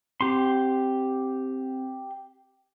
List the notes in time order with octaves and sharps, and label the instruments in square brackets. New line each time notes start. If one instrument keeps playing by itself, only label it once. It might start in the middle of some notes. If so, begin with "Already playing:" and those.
[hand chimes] C4 [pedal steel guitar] G4 C6